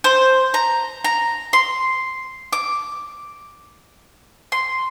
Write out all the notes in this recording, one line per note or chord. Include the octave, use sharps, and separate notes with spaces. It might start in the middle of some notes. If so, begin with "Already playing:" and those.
C5
A#5
A#5
C6
D6
C6